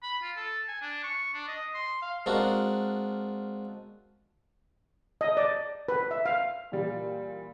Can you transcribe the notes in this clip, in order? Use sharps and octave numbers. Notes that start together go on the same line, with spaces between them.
B5
F4
A4
G#5
D4
C#6
D4
D#5
C6
F5
G#3 C4 D4 F4 F#4 A#4
D#5
D5
B4
E5
F5
A#2 E3 G3